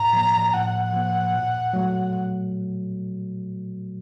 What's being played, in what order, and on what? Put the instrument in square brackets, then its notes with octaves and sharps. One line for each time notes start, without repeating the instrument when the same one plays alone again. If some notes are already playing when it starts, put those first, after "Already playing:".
Already playing: [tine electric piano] A2 [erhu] A#5
[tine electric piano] F3 A#3
[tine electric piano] A2 [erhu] F#5
[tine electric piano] F3 A#3
A#2
F#3 A3